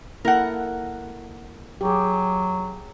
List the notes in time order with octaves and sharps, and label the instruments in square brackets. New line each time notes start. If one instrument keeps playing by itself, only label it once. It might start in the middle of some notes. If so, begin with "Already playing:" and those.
[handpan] A#3 E4 A4 [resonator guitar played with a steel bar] A#4 F#5
[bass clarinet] F#3 [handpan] G4 G#4